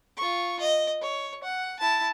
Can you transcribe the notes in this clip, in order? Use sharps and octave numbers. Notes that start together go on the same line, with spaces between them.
F4 C#6
D#5
C#5
F#5
E4 A5